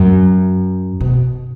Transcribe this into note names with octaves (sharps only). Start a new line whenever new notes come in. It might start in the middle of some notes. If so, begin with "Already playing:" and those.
Already playing: F#2
B2